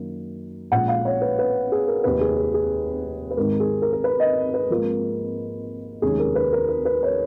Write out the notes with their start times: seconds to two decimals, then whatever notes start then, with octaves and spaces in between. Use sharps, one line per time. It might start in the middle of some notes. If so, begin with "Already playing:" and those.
Already playing: F#2 D#3 A#3
0.71 A#1 A#2 G#3 C#4 F#5
0.88 F5
1.05 C#5
1.22 B4
1.39 B4
1.72 G#4
1.88 A#4
2.04 F1 D#2 D#3 B4
2.21 G#4
2.38 G#4
2.54 G#4
3.31 B4
3.37 G#1 G#2 D#3 A#4
3.60 G#4
3.82 A#4
3.93 A#4
4.04 B4
4.20 D#5
4.54 B4
4.70 G#1 G#2 F3 A#3 F4 A#4
6.02 F1 D#2 D#3 G#3 C#4 G#4
6.19 A#4
6.35 B4
6.53 A#4
6.69 A#4
6.85 B4
7.03 C#5